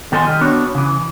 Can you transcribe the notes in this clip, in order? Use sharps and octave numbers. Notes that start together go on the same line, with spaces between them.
B2 D#3 A4 D#5 G#5 C6
D#3 G3 F4 D#5
B3 D4 F#4 A4 C#5
C#3 E3